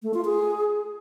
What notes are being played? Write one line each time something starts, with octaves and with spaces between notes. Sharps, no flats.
A3
F4
G#4